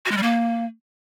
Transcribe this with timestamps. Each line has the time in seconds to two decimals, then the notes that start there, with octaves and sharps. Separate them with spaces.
0.06 F#4
0.11 G#3
0.17 G3
0.23 A#3